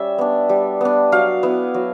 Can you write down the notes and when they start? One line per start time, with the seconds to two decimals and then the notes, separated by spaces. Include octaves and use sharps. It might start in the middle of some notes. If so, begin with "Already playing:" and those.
Already playing: G3 C#4 E5
0.18 B3 D4
0.49 G3
0.81 B3 D4
1.12 F#3 F5
1.43 B3 E4
1.74 F#3